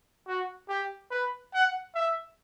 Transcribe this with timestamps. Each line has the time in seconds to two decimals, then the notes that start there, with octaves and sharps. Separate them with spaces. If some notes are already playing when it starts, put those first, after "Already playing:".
0.27 F#4
0.69 G4
1.11 B4
1.54 F#5
1.95 E5